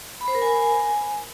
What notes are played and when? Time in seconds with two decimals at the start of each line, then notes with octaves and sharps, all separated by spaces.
0.21 B5
0.28 C5
0.35 A#4
0.42 G#5